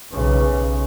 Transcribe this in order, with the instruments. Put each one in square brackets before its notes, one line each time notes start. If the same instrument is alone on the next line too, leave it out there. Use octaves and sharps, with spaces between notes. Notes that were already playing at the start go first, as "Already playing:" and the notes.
[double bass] B1 C#3